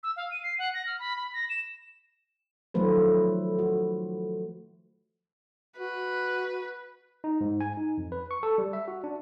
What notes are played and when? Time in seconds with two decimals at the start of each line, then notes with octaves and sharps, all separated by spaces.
0.03 E6
0.16 F5
0.30 D#7
0.43 C7
0.58 F#5
0.73 A#6
0.86 F6
0.99 B5
1.16 B5
1.33 A#6
1.49 E7
2.74 D#3 F3 F#3 A3 B4 C5
3.59 F#4
5.78 F#4 B4
7.24 D#4
7.41 G#2
7.61 G#5
7.77 D#4
7.98 F2
8.12 B4
8.31 C#6
8.43 A4
8.58 G3
8.73 E5
8.88 F#4
9.04 D4